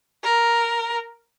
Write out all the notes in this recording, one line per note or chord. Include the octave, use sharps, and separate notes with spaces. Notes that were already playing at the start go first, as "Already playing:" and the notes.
A#4